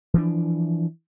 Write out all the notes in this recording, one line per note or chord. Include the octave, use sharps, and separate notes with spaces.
E3 F3 D4